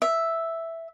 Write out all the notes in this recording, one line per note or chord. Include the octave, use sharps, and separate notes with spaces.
E5